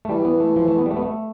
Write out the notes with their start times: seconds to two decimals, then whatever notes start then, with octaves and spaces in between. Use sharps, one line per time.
0.05 A3
0.09 E3 G3
0.25 B3
0.40 A3
0.56 F3
0.68 A3
0.78 B3
0.86 G3
0.91 A3
0.97 B3
1.02 A3